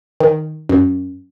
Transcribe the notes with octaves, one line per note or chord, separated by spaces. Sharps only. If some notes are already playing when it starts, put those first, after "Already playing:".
D#3
F#2